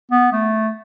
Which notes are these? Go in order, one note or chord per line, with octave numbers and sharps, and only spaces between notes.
B3
A3